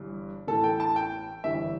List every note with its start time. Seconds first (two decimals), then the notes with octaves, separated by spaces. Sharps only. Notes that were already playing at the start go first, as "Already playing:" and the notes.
Already playing: G1 G2 E3
0.47 A1 A2 E3 A4
0.64 G5
0.80 A5
0.96 G5
1.44 G1 G2 E3 E5